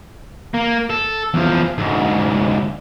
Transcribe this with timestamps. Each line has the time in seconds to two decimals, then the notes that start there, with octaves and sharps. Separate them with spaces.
0.54 A#3
0.90 A4
1.34 E2 F3
1.78 D2 G#2